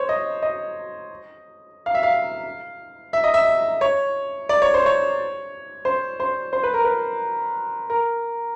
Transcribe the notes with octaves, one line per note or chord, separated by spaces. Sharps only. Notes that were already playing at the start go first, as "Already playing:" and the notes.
Already playing: C5 C#5
D#5
D#5
F5
E5
F5
E5
D#5
E5
C#5
D5
C#5
C5
C#5
C5
C5
C5
B4
A#4
B4
A#4